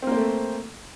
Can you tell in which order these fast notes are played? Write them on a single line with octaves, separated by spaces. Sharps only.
C4 A#3 C5 A3